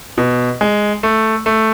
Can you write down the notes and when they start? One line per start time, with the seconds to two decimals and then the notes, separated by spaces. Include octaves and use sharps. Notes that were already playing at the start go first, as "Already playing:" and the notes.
0.18 B2
0.61 G#3
1.03 A3
1.46 A3